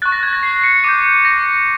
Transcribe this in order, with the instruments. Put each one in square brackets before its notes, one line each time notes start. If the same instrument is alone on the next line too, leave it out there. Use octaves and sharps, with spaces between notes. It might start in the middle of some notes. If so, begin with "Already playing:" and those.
[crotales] C#6 F#6 A6
A#6
G#6
A#6
C7
C#7
D6 G6 D#7
A#6